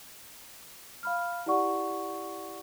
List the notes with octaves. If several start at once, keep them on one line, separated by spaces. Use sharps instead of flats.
F5 B5 F6
E4 G4 D5 F#5 C#6